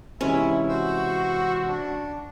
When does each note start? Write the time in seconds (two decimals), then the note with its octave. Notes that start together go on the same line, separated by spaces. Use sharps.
0.21 G#2 C3 E3 G#3 C#4 E4
0.69 F#4 C5 E6
1.67 D4